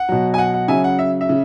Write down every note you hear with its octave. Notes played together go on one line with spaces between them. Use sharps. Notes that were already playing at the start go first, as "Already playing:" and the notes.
Already playing: F#5
B2 F#3
G#5
F#5
F#5
C#3 F#3 E5 G#5
F#5
E5
E5
C#3